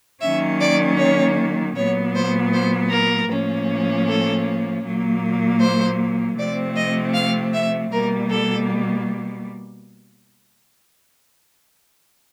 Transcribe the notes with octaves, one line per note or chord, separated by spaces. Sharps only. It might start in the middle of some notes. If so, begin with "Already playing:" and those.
D#3 F#3 A#3 C#4 E5
D5
C#5
A#2 F#3 B3 C#5
C5
C5
A#4
A2 F3 A#3 C#4
A4
A#2 F#3 A#3
C5
C3 F3 A3 C4 D5
D#5
F5
E5
B2 G3 A#3 A#4
A4